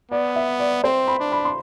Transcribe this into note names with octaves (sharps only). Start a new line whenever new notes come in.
B3 D5
E5
D5
C4 C5
B5
D4
B5
C6